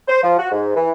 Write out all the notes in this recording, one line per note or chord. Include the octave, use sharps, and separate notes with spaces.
C5
F3
F#4
G#2
E3